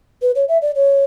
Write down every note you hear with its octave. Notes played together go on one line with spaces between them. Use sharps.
B4
C#5
E5
D5
C#5